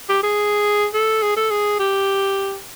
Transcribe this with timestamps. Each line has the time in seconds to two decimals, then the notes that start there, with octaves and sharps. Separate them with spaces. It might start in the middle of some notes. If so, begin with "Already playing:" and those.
0.09 G4
0.23 G#4
0.94 A4
1.23 G#4
1.37 A4
1.51 G#4
1.79 G4